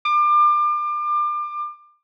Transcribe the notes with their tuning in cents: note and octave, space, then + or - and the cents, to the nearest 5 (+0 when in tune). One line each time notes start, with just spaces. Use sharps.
D6 +30